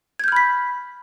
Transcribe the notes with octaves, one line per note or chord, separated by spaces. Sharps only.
B5 F6 G6 G#6 B6